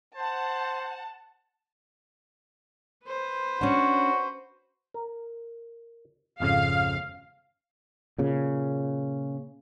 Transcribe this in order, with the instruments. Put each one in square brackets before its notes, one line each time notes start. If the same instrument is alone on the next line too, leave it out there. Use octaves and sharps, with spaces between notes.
[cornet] C5 [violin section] F#5 A5
[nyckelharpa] B4 C5
[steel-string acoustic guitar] C#4 D4 [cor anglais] F#4
[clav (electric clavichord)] A#4
[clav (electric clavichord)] G#1 F2 C#3 [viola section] F5
[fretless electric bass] A#2 C#3